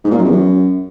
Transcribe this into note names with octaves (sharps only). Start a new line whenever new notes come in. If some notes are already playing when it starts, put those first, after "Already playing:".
G#2
A#2
F#2
E2
F#2